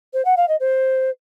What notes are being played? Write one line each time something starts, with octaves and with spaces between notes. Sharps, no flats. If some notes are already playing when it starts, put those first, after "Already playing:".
C5
F#5
F5
D#5
C5